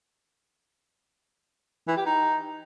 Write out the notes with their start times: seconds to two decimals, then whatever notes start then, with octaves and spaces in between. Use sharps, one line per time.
1.88 E3
1.97 G4
2.06 D#4